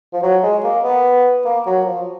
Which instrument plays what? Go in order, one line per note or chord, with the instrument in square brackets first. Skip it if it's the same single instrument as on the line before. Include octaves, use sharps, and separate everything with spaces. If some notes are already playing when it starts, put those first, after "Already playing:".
[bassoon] F3
F#3
G#3
A#3
B3
A#3
F#3
F3